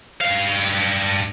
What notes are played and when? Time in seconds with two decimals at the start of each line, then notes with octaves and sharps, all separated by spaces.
0.21 G2 F5